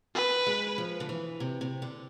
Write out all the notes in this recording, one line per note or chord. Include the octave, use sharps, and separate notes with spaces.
B4
G#3
F3
D3
E3
C3
C3
D3